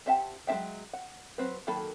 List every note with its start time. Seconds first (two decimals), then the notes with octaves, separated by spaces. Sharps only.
0.06 C4 G4 E5 F#5 A5
0.47 F#3 G#3 D4 E5 G5
0.93 F#5
1.38 F#3 C4 B4
1.67 D#3 F#3 A#3 A4 B5